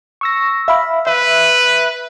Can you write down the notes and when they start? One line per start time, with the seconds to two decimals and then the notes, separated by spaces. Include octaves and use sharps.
0.21 C#6 E6 A#6
0.68 E5 F5 B5
1.07 B4 E5